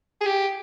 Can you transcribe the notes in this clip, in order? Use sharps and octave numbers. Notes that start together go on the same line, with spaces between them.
G#4
G4